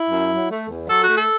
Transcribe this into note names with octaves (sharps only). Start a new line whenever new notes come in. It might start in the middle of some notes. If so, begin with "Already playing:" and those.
Already playing: E4
F#2
F#3
A3
E2
F#3 A4
F#4
A3
A4